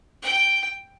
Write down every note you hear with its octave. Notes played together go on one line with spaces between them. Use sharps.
G5